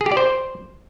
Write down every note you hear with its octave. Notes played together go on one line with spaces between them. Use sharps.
G#4
G4
D5
C5